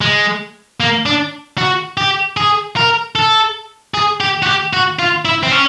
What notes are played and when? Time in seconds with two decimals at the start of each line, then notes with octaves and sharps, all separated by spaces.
0.01 G#3
0.80 A#3
1.06 D4
1.58 F#4
1.97 G4
2.37 G#4
2.76 A#4
3.15 A4
3.94 G#4
4.20 G4
4.43 F#4
4.47 G4
4.73 F#4
4.99 F4
5.25 E4
5.43 C4
5.52 C#4